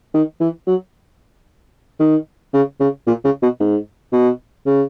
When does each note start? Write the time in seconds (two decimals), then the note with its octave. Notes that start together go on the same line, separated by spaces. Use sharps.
0.14 D#3
0.40 E3
0.67 F#3
2.00 D#3
2.54 C#3
2.80 C#3
3.07 A#2
3.24 C#3
3.42 B2
3.60 G#2
4.13 B2
4.66 C#3